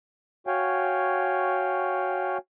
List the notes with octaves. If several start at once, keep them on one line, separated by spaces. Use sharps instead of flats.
F#4 C#5 F5 G5 G#5